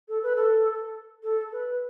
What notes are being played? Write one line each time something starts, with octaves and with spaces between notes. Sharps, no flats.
A4
B4
A4
A4
B4